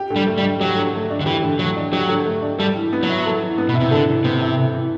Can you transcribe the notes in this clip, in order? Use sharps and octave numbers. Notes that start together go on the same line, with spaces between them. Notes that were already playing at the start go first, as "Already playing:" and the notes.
Already playing: G4
D3
G3
A3
G3
D4
F#3 G4
D3
A3
D4
D3
E3 G4
D3
F#3 A3
D4
F#3 G4
D3
A3
D4
G3 A4
E3
B3
F#3
E4
A4
E3
B3
B2
E4
C3
D3 A4
E3
C3 B3
E4
A4
E3